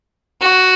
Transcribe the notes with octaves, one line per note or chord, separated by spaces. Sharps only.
F#4